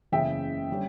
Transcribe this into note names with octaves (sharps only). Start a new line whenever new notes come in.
F#1 E2 C#3 E5 G5
D3 G3 C#4